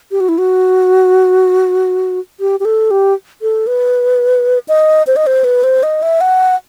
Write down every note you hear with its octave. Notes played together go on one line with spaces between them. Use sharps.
G4
F#4
E4
F#4
G4
G4
A4
G4
A4
B4
D#5
C5
D#5
C5
B4
C5
D#5
E5
F#5